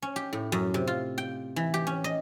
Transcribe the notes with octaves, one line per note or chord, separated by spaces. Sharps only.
C#4
G4
A2
F#2
C3
F4
G5
E3
G4
C#4
D#5